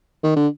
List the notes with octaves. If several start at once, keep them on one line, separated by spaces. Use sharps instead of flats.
D#3
D3